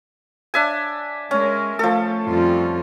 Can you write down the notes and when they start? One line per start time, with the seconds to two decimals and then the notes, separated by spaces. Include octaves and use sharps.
0.54 D4 E5 G#5
1.31 G#3 C#4 A#4
1.79 F3 A3 A4
2.25 F2 G3 F4